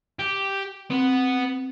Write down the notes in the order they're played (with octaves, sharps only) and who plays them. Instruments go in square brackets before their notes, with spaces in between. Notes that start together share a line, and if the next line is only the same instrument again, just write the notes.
[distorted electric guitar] G4
[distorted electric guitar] B3 [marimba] C4